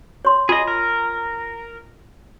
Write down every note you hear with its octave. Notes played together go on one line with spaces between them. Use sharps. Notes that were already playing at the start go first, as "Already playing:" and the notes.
C#5 C6
F4 G#4 D#5
A#4